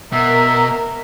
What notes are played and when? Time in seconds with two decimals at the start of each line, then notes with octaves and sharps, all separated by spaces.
0.13 B2 A#4 E5